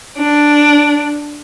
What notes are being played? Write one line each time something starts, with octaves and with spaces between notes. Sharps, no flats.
D4